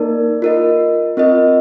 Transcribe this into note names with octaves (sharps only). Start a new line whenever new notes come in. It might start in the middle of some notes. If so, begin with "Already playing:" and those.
Already playing: A#3 D#4 A#4 D5
F4 A#4 D#5
C4 F4 A#4 D#5